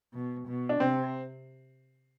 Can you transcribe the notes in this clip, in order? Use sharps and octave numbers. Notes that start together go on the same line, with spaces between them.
B2
B2
D4
C3 C4